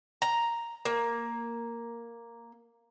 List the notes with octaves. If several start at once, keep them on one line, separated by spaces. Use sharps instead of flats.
A#5
A#3